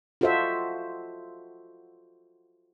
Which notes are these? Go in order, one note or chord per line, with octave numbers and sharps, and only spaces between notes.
F4 F#4 A4 C5 D#5 E5